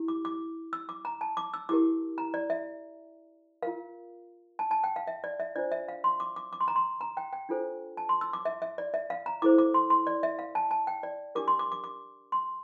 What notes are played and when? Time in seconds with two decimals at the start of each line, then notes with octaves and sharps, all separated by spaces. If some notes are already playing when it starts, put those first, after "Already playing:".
Already playing: E4 G4
0.08 D6
0.25 D6
0.73 E6
0.89 D6
1.05 A#5
1.21 A5
1.37 D6
1.54 E6
1.69 E4 G4 A#4 D6
2.18 A#5
2.34 D5
2.50 E5
3.62 F4 A#4 F5
4.59 A5
4.71 A5
4.84 G5
4.96 F5
5.07 E5
5.24 D5
5.40 E5
5.56 D4 F4 C5 D5
5.71 E5
5.88 F5
6.04 C6
6.20 D6
6.36 D6
6.53 D6
6.60 C6
6.68 A#5
6.76 C6
7.01 A#5
7.17 G5
7.33 G5
7.49 D4 F4 A4 C5
7.97 A5
8.09 C6
8.21 E6
8.33 D6
8.45 E5
8.62 E5
8.78 D5
8.94 E5
9.10 F5
9.26 A#5
9.42 E4 A4 C5 D6
9.58 D6
9.74 C6
9.90 C6
10.07 D5
10.23 E5
10.39 F5
10.55 A5
10.71 A5
10.87 G5
11.03 D5
11.35 D4 G4 A#4 D6
11.48 C6
11.59 D6
11.72 D6
11.84 D6
12.32 C6